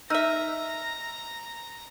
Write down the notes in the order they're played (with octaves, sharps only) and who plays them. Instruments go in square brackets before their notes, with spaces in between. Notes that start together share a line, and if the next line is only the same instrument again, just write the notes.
[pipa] D#4 E5 [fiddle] A#5 [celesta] E6 F6 D#7